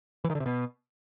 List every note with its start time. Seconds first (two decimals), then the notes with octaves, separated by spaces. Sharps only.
0.24 E3
0.30 D#3
0.35 D3
0.40 C3
0.46 B2